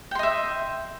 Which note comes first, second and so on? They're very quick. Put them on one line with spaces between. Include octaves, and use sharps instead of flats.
G5 C6 D#5 E5